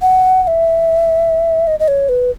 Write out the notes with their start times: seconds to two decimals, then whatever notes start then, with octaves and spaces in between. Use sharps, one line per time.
0.02 F#5
0.43 F#5
0.47 E5
1.67 D#5
1.80 D#5
1.88 C#5
2.09 B4